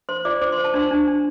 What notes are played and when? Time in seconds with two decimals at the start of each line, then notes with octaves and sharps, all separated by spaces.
0.09 C5 C6
0.25 F4 D5 D6
0.41 C5 D6
0.52 C6
0.58 C5
0.64 A5
0.74 D4 C5 C6
0.91 D4
1.07 D4